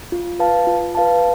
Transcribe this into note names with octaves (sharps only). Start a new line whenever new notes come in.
F4
B4 F5 A5
F4
B4 F5 A5